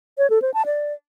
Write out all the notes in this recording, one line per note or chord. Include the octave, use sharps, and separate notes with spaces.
C#5
A4
C5
A5
D5